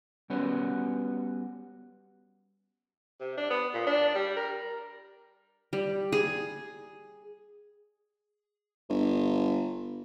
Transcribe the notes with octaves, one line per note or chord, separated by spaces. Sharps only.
G3 B3 C#4 F#4 B4 C#5
C3
D4
B3
A#2
D4
G3
A#4
G3
G#4
G1